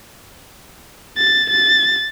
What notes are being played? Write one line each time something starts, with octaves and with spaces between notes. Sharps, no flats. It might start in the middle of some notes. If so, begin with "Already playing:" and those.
A6
A6